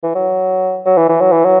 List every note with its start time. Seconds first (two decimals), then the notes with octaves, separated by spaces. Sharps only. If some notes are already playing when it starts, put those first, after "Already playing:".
0.03 E3
0.15 F#3
0.86 F#3
0.97 E3
1.09 E3
1.21 F#3
1.32 E3
1.45 F#3